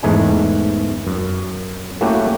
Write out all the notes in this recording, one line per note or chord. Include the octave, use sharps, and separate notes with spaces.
E2 G#2 A3 D#4 G#5
F#2
A3 A#3 C#4 E4 F#4 G4